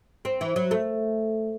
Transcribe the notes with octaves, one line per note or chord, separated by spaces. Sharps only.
C4
E3
F#3
A3